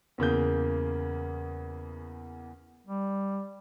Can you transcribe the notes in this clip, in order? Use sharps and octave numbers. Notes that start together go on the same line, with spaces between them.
E2 C#3 A#3 G6
G3